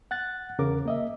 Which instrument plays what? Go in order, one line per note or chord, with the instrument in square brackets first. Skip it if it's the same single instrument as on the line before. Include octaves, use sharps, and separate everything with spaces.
[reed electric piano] F#5 F#6 A6
E2 C#3 A#4 D6
A#3 D#5 E5